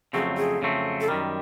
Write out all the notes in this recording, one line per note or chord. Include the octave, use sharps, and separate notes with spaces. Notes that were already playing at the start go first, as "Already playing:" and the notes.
F2 C#3 F#3 A3 C4 G#4
G#4
F2 C#3 F#3 A3 C4
A4
F#2 D#3 G3 A#4